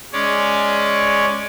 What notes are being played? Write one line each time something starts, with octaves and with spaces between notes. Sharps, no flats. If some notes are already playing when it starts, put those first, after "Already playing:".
G#3 C#4 C#5 D5